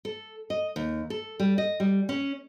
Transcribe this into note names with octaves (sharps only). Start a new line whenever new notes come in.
A4
D#5
D#2
A4
G3
D#5
G3
C#4